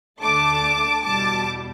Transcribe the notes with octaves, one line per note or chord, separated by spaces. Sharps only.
D2 D3 A3 D4 A5 D6
E2 B2 G3 A5 D6